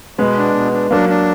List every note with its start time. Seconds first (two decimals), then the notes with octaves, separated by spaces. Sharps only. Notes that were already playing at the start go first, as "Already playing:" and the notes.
0.18 B2 G#3 B3
0.37 D4
0.55 B2
0.73 D4
0.91 F#3 A#3 D4
1.09 D4